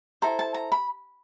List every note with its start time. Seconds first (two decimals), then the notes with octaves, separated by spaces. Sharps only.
0.22 E4 A4 C5 A#5
0.39 A5
0.54 A#5
0.72 B5